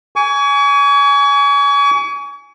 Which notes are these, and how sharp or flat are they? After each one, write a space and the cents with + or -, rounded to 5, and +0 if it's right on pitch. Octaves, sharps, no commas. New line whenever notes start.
G#5 +0 C#6 +40